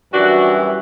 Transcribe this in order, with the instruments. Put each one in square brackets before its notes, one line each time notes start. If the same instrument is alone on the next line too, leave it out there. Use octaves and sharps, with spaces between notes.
[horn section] F#2 E3 G3 D4 F#4